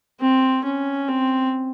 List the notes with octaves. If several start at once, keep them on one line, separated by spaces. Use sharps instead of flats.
C4
C#4
C4